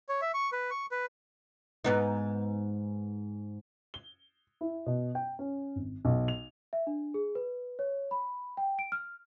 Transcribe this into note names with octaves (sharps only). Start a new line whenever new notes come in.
C#5
E5
C#6
B4
C#6
B4
G#2 B3 D#4
G7
E4
B2
G5
C#4
G#1
B1
F7
E5
D4
G#4
B4
C#5
B5
G5
D7
F6